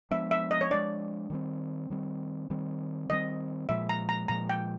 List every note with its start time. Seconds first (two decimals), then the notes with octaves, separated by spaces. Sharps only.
0.11 F3 G#3 B3 D4 E5
0.31 E5
0.51 D#5
0.61 C#5
0.70 F3 G#3 B3 D4 D5
1.30 D#3 G3 C4
1.90 D#3 G3 C4
2.50 D#3 G3 C4
3.09 D#3 G3 C4 D#5
3.69 A#2 F3 G#3 E5
3.89 A#5
4.09 A#5
4.28 A#2 F3 G#3 A#5
4.49 G5